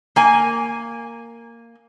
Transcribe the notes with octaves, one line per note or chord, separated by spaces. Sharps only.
A#3 G#5